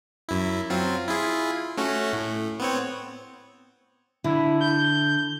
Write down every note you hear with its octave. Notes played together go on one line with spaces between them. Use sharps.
F#2 E4
F#3 C4 F4
E4 F4 G#4
A3 C#4 F#4
A2
B3 C4 C#5
D3 E4
G6